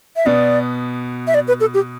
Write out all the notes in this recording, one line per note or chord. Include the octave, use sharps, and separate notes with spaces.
E5
B2 B3 D5
E5
D5
B4
A4
G4